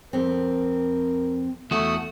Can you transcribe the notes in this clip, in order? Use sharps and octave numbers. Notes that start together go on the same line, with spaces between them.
F2 C4 A#4
E2 A3 F#4 D#6